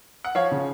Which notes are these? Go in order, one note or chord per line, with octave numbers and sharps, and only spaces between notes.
F#5
F3 C#5 F5
C#3